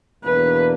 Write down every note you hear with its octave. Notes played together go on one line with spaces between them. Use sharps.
E2 B2 A#3 D4 B4